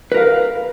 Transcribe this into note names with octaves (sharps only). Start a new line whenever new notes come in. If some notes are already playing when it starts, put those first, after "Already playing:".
A#4 B4 F5